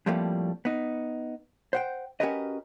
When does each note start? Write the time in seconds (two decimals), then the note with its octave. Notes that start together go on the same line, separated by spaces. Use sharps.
0.06 F2 A2 F3 G3 A3 A#3
0.65 B3 D#4
1.73 C5 F#5 G5
2.20 C#4 F#4 G4 A#4 B4 D#5